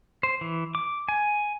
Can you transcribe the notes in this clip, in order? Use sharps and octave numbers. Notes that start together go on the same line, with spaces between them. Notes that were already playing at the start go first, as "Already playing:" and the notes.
C5
E3
D6
G#5